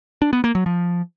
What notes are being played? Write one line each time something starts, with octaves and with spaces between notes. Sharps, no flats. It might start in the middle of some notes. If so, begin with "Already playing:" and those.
D4
B3
A#3
F#3
F3